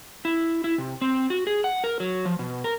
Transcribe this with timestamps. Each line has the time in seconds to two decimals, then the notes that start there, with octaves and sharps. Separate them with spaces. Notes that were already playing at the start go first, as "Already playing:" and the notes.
0.25 E4
0.64 E4
0.78 C3
1.01 C4
1.30 F#4
1.47 G#4
1.64 F#5
1.84 A#4
2.00 F#3
2.25 F3
2.39 B2
2.64 A#4